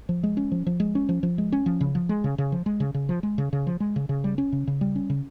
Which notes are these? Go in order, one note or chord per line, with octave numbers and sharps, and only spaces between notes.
F3
G#3
C#4
F3
F3
G#3
C#4
F3
F3
G#3
C#4
F3
C#3
F3
G#3
C#3
C#3
F3
G#3
C#3
C#3
F3
G#3
C#3
C#3
F3
G#3
C#3
C#3
G3
C#4
C#3
C#3
G3
C#4
C#3